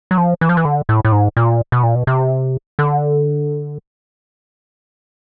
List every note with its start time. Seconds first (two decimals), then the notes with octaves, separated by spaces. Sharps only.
0.11 F#3
0.18 F3
0.41 E3
0.49 F3
0.57 E3
0.65 D3
0.89 A2
1.05 A2
1.12 G#2
1.37 A#2
1.72 B2
1.83 A#2
1.95 B2
2.07 C3
2.79 D3